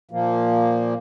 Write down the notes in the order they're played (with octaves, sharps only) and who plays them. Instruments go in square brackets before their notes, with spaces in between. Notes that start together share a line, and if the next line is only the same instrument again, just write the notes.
[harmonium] A#2 F3 A#3